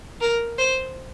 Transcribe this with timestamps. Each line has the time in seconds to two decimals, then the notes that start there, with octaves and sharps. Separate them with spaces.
0.21 A#4
0.58 C5